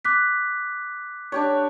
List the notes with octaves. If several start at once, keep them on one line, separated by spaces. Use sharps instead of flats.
D6 F#6 B6
D4 G4 C#5